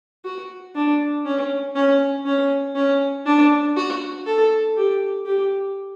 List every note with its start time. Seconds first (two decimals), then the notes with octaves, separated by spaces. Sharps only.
0.25 F#4
0.75 D4
1.25 C#4
1.75 C#4
2.26 C#4
2.75 C#4
3.25 D4
3.76 F#4
4.26 A4
4.77 G4
5.26 G4